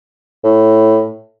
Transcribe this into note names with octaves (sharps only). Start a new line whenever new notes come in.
A2